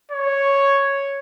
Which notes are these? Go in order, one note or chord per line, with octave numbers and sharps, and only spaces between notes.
C#5